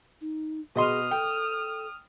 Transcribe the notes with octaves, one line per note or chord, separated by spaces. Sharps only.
D#4
B2 G#4 D#5 C6 D#6 F6
A4 G5